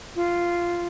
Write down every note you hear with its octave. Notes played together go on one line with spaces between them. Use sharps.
F4